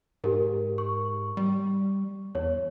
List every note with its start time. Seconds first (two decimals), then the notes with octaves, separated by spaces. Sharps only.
0.24 G#2 G4 A#4
0.78 C#6
1.37 G3
2.35 E2 C#5